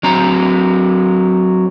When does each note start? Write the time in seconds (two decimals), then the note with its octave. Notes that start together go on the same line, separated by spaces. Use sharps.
0.03 F#3 C4 A#5